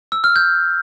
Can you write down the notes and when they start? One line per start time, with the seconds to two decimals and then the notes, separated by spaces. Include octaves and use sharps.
0.12 E6
0.24 F6
0.36 G6